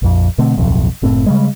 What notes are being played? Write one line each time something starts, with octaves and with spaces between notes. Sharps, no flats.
A#1 F2
B2 D3 A3 C4
D1 B1 F2
F#1 A2 C4
C#3 G3 G#3